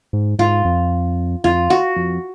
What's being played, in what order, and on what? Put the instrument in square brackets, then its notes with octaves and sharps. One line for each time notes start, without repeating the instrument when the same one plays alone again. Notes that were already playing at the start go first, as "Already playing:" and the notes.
[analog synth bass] G#2
[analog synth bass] G#2 [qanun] F4
[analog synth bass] F2
[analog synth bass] F2 [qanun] F4
[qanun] F#4
[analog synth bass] F2